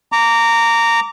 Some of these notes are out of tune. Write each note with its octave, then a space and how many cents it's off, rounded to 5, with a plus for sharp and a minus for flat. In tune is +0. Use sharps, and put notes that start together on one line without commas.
A#5 -15 D6 -20